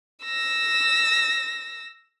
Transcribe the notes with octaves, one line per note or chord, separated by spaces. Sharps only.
E6 A#6